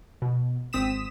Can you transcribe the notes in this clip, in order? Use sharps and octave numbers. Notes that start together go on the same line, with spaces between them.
B2
G#1 C4 D#6 B6 E7